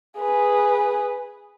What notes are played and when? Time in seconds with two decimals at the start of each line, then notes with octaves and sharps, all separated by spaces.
0.18 G#4 B4